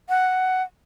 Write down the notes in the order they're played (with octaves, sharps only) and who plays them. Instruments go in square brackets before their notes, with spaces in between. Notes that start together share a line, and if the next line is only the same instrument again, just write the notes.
[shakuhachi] F#5